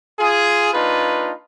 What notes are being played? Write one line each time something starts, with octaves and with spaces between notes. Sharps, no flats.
F4 G#4
A#3 D4 D#4 F4 B4